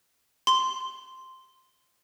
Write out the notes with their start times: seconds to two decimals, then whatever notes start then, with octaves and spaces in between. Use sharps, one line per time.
0.47 C6